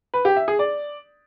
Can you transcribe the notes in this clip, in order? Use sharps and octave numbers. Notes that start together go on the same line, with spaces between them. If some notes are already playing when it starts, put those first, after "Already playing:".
B4
G4
E5
G#4
D5